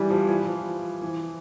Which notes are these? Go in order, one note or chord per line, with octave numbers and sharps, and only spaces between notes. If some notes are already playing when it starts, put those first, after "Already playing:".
Already playing: E3 G3
F3
E3
F3
E3